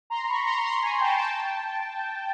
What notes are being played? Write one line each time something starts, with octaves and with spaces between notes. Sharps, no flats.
A#5 C6
B5 C#6
A#5 C6
A#5 C6
G#5 A#5
G5 A5
G5 A5